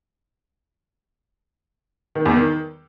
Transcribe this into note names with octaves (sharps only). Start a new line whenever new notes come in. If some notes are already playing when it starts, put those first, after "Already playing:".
D#3
E2
D#3